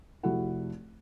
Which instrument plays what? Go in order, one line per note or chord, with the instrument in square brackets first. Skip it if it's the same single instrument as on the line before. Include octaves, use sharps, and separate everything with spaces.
[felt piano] F1 E4 F#4 G4 A4 F#5